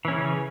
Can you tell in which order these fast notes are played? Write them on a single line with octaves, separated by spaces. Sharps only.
E3 C#4 C#3